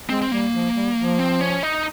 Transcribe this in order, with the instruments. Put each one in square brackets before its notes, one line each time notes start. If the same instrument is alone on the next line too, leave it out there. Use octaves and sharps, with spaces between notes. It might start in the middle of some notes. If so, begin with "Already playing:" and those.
[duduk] G#3 [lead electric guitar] C4
[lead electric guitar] C4
[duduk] G3 [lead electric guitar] A#3
[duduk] F3
G3
F3
[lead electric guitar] C4
C#4
D#4